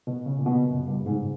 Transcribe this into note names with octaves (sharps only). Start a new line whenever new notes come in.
B2
C#3
A#2
B2
F#2
G2
G#2